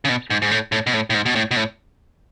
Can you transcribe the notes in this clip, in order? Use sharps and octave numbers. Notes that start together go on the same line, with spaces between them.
C#3
B2
G#2
G#2
A2
A2
B2
A2
A2
G#2
B2
A2
B2
A2